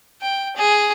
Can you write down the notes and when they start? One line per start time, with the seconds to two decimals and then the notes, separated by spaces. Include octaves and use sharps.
0.22 G5
0.56 G#4